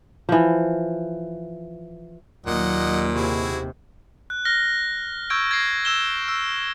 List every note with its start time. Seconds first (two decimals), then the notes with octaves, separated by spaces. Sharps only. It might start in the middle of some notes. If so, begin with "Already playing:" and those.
0.29 E3 F3
2.47 D#2 A#2 F#3 D#5 F#5
3.15 C3 E4 F#4 G#4
4.30 F#6
4.45 F6 A#6 G7
5.30 C#6 E6 G6 G#6 D7
5.51 G#6 A#6 C7
5.85 E6 E7 G7
6.28 E6